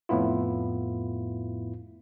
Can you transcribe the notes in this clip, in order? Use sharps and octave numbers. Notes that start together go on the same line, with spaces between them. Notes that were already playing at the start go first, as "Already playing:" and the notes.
F2 A2 B3 E4 F4